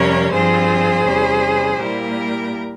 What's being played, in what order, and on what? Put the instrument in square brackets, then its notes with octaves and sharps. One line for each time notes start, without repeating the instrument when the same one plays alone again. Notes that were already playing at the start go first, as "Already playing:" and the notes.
Already playing: [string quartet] F2 C3 G3 C#4 A#4 C#5
G2 F3 C4 F4 G#4 C5
E2 C3 G3 C#4
A#2 G3 A#3 E4 G4 A#4